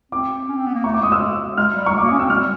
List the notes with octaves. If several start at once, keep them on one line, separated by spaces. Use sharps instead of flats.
C4 D6
C#4
C4
B3
A#3
A3 C#6
D6
G#3 D#6
E6
G#3 F6
G3
C#6
G#3
A#3 D6
C#4 D#6
C4 E6
G#3 F6
G3